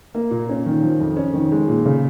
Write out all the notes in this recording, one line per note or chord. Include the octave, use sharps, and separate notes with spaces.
A#3
A#2
C#4
D#3
F3
F2
C#4
D#3
G#3
A#2
C#3